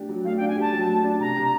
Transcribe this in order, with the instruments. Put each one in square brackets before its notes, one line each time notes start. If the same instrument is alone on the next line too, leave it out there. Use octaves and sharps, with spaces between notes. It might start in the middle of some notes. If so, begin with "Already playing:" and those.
Already playing: [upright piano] A3 D4 G4
F#3
[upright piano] A3 [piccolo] F5
[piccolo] G5
[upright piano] D4
[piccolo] G#5
[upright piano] G4 [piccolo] A5
[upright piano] F#3
A3
D4
[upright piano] C3 [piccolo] A#5
[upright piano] C3